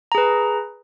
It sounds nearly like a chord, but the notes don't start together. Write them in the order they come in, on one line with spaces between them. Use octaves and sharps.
A#5 G#4 B4